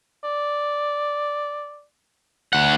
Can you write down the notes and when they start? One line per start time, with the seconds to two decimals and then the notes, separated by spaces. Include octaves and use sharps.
0.24 D5
2.53 D2 F#5